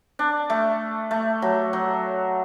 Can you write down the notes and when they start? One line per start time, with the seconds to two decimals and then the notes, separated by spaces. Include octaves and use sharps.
0.19 D4
0.50 A3
1.11 A3
1.42 F#3
1.73 F#3